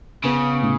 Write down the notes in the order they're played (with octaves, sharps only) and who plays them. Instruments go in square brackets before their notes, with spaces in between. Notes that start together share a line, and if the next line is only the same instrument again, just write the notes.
[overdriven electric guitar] C#3 [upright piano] B3
[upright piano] A2